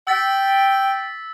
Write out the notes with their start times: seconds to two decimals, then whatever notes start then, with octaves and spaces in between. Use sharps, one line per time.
0.07 G5 E6 A6 B6